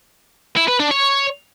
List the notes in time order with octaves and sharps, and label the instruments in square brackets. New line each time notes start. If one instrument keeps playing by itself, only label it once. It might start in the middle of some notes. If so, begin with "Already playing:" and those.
[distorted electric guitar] E4
B4
D4
C#5